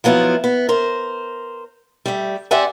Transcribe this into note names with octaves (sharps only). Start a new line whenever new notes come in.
F3 F#3 B3 E4 F4
B3
A#4 C5
G3 A3
C4 G4 D5 E5 F#5 G#5